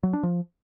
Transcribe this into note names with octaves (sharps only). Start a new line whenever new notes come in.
F#3
D4
F3